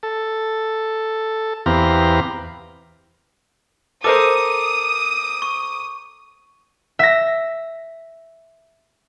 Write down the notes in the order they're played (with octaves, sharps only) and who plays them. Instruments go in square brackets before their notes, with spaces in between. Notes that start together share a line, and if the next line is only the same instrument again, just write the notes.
[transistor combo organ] A4
E2 B3 C4 G4 F5 A#5
[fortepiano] A4 A#4 C5 [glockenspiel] D6 [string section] D#6
[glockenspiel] C#6
[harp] E5 A#6